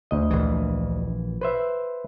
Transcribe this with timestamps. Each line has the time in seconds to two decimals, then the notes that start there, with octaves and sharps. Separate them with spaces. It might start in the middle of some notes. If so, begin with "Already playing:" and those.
0.11 D2 D#5
0.30 A#1 E3
1.41 B4 C5 E5